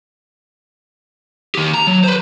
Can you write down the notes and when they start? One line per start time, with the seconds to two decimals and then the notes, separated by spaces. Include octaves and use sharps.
1.55 D#3 G4
1.74 A#5
1.87 F#3
2.04 B4 C5